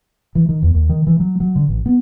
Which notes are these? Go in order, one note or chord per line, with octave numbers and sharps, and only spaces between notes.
E3
D#3
E2
D#2
D#3
E3
F#3
F#3
D3
A1
B3